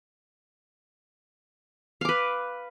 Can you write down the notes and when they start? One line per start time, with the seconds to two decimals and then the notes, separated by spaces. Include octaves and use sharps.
2.01 F5
2.05 D6
2.09 B4